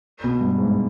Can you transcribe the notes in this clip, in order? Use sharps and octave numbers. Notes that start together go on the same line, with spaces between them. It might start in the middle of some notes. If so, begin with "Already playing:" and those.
B2
G2
G#2